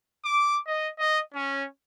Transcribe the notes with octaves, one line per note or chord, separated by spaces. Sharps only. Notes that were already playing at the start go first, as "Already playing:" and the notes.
D6
D#5
D#5
C#4